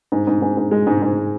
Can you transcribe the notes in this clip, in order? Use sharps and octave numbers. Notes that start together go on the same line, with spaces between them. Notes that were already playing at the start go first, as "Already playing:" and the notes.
G#2
G#2
G#2
G#2
G#3
G#2
G#2